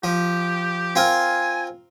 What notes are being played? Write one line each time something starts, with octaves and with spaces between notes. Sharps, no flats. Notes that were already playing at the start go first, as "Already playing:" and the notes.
F3 G4
C4 F4 A#4 G#5